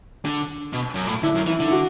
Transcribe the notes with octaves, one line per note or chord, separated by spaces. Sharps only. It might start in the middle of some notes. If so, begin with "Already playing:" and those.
D3
B2
F#2
A2
D3 E4
F#2
E3 E4
D3
E4
F#4